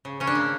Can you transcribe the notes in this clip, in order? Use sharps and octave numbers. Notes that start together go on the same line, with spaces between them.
C#3
C#3 C#4
D4
A#3